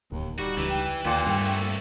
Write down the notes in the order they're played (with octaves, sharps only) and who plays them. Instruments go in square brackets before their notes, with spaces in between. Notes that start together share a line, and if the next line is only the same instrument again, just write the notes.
[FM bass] D1 [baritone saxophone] D#2
[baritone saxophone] G3 [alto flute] D#4 [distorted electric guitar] F#4
[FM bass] C#2 [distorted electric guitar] E3
[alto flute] G5
[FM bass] D#2 [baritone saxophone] A#2 [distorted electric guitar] A4 B4
[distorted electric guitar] C2 A3 [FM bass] G2